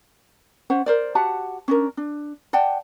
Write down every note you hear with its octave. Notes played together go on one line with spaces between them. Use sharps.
C#4 C5 F#5
A#4 C5 D5
F#4 G4 F#5 A5
C#4 D4 A#4
D4
D5 F#5 G5 A5